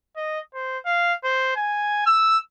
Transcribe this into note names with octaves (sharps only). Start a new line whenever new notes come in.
D#5
C5
F5
C5
G#5
E6